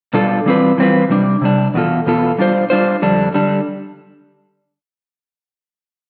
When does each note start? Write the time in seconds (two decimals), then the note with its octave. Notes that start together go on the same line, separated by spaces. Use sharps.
0.14 B2 G3 D4 F4 A4
0.46 E3 G3 C4 F4 B4
0.78 E3 G3 C4 F4 B4
1.09 C3 G3 D4
1.42 C3 G3 D4
1.74 E2 B2 B3 F4 A4
2.06 E2 B2 B3 F4 A4
2.38 G3 D4 F4 C5
2.70 G3 D4 F4 C5
3.02 F2 D3 G3 D4
3.34 D3 G3 D4